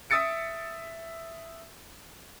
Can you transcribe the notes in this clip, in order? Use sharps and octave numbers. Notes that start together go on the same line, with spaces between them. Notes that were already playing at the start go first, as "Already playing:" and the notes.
E5 D#6 E6 A6 C#7 D7